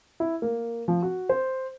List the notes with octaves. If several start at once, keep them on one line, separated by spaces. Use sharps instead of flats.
E4
A#3
F3
F#4
C5